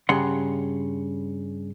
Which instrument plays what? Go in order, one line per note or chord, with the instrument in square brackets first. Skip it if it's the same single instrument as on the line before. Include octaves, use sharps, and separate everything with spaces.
[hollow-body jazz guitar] G2 C#3 F#5 C6